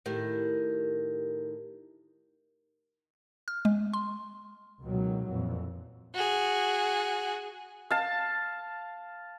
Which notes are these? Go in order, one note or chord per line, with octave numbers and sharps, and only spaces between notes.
A2 D#3 G4 A#4
F6
G#3
C6
C#2 B2 D#3 F#3
F2 A#2 E3
F#4 G#4
F5 A5